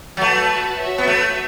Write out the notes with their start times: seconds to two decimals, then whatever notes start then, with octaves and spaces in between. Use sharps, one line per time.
0.17 F#3
0.21 A3 F#4 B4 A5
0.79 F#4 C#5 E5
0.98 B3
1.07 A3